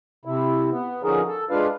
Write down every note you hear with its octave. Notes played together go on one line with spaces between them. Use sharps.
C3 E4
B3
D3 F3 C#4 D#4 G#4 A#4
A4
G#3 D4 F4 B4 F5